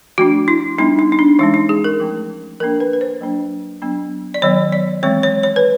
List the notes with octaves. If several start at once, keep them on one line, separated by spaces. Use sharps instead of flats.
F3 A3 D4 F#4
E4
G3 B3 D4 D#4
D#4
D#4
D4
E3 G#3 C#4 D#4
D#4
G#4
A#4
F3 A3 C#4
F3 A#3 D4 A#4
B4
B4
C5
F#3 A#3 D4
F#3 B3 D4
D5
D#3 F#3 B3 C#5
D5
E3 G#3 C4 C#5
C#5
C#5
B4